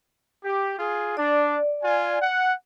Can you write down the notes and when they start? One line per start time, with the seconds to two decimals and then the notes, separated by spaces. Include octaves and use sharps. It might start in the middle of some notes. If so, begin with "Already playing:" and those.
0.44 G4
0.78 F4 G#4
1.17 D4 D5
1.83 F4 G#5
2.21 F#5